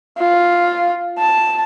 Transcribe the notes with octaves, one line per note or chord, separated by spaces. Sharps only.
F4
A5